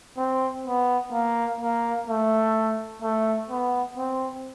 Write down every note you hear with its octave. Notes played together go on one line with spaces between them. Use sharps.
C4
B3
A#3
A#3
A3
A3
B3
C4